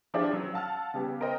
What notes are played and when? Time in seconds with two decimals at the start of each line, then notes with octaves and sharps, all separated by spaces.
0.14 F3 D4 E4 G4 G#4 D5
0.30 F#3 C#4
0.53 F5 F#5 A5 E6 F6
0.94 C#3 G3 B3 G4
1.21 A#4 C5 D#5 G5 A#5